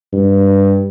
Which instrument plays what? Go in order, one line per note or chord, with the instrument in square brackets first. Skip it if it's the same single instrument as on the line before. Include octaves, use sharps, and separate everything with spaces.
[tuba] G2